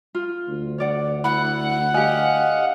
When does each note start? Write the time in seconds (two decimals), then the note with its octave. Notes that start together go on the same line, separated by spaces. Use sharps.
0.15 F4
0.48 D2
0.78 C#5 D5 F#5
1.24 E4 F#5 B5
1.94 G4 D#5 F5 G#5